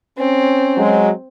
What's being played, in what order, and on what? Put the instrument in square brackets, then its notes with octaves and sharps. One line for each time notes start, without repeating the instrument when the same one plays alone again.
[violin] C4 [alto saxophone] C#4
[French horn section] F#3 G#3